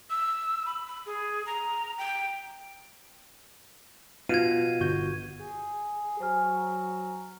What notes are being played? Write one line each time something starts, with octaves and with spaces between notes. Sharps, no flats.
E6
B5
B5
G#4
A#5
G5
B2 F4 F5 G#6 D#7
G1 F#4 G6
G#4
F#3 C5 G#5 F6